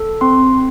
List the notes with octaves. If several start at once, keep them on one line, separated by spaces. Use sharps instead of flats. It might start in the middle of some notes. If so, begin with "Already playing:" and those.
Already playing: A4
C4 C6